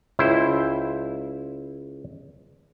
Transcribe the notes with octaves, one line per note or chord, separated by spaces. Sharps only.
C#2 E4 C5